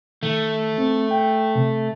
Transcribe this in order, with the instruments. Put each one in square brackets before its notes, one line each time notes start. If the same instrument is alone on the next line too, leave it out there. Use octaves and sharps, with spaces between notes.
[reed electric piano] D#3 [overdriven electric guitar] A3
[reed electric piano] C4
G5
C3